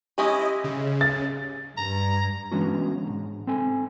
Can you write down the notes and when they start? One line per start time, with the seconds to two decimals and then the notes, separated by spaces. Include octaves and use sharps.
0.18 G#3 C#4 E4 G4 D#5 E6
0.64 C#3
1.01 A6
1.77 G2 A#5
2.52 E3 G#3 B3 C#4 D4 F#4
3.06 D2 G#2
3.47 C4 A4 G#5